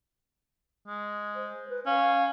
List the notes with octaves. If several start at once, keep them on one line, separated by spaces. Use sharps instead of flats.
G#3
C5
B4
C#4 F5